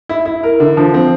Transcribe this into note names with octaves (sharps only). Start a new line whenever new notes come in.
E4
E4
A#4
D3
F3
C4